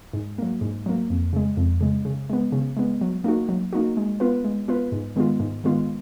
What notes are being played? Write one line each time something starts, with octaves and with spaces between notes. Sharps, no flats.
G#2
F#3 A#3
G#2
F#3 A#3
F2
C#3 G#3
F2
C#3 G#3
C#3
G#3 B3
C#3
G#3 B3
F#3
A#3 D#4 F#4
F#3
A#3 D#4 F#4
G#3
B3 F4 B4
G#3
B3 F4 B4
G#2
D#3 G#3 B3 F4
G#2
D#3 G#3 B3 F4